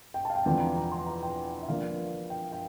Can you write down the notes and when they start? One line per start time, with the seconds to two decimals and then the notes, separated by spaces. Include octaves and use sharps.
0.14 G5
0.25 A5
0.30 F5
0.35 G5
0.45 E2 D3 F3 C4 G5
0.60 A#5
0.76 A#5
0.92 C6
1.07 A#5
1.23 G5
1.62 E5
1.68 D3 F3 A#3 D4 F5
2.30 G5
2.52 G5